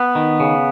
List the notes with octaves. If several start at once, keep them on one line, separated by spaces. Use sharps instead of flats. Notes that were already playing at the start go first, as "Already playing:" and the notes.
Already playing: B3
D#3
C#3